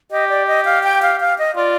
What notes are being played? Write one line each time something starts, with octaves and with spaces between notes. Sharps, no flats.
G4 D#5
D5
D#5
F5
G5
F5
F5
D#5
F4 D5